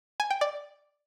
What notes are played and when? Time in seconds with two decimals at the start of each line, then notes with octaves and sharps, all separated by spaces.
0.20 G#5
0.30 G5
0.41 D5